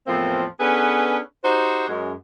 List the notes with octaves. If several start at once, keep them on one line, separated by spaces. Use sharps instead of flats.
E2 A2 F3 A#3 C4
B3 C#4 D4 G#4 A4 B4
D#4 F#4 G4 C5
F#2 G#3